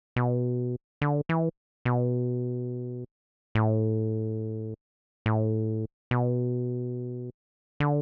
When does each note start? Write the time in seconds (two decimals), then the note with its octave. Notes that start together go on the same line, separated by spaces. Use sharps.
0.16 B2
1.02 D3
1.29 E3
1.85 B2
3.55 A2
5.26 A2
6.11 B2
7.80 D3